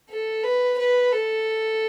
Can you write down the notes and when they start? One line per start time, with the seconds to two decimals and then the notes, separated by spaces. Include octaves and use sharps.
0.09 A4
0.43 B4
0.78 B4
1.12 A4